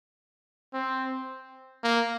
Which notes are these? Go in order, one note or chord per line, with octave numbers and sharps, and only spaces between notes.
C4
A#3